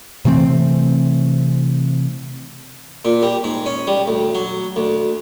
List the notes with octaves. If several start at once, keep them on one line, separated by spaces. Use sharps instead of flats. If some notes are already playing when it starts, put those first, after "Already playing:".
C3 E3 A3 C4
A#2
G3
G#2
C#4
G3
D2
F#3
D2